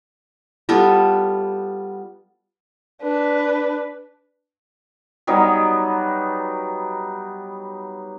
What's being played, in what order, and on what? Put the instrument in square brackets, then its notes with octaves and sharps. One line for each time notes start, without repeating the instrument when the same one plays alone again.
[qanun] G3 B3 F4 A4
[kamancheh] D4 B4
[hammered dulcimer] F#3 G3 B3 D#4